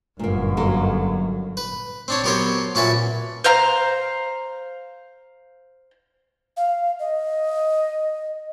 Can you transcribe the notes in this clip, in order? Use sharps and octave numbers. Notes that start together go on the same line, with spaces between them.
G1 F#2 A#2 A#3
F#3 A#3 A4
B4
C4 D4 C#5
F#3 B3 G4 A#4 C5 C#5
A#2 C#4 F#4 B4 E5 A5
C5 F5 A#5
F5
D#5